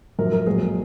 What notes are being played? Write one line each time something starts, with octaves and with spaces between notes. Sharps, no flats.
G#1 F#2 F3 A#4
A#4
A#1 G#2 F#3 G#4